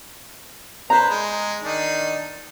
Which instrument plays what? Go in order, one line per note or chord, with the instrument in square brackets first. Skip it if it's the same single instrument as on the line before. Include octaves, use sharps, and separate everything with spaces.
[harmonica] B4 C5 [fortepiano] A#5
[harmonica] G#3
D#3 D4 D#4